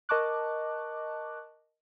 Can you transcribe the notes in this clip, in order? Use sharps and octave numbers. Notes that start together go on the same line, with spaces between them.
A#4 D#5 A5 C#6 D6 F#6